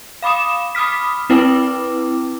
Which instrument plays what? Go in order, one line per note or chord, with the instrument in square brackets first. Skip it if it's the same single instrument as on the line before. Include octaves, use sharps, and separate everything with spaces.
[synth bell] F5 B5 D6 D#6 E7
B5 D6 D#6 F6 B6
C4 E4 B4 G5 D6